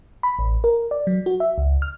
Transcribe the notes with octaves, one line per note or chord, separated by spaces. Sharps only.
B5
A1
A#4
D5
F#3
F#4
E5
C#2
F6